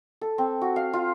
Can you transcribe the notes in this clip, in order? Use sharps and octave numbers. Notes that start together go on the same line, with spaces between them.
A4
C4
F#4
F5
F4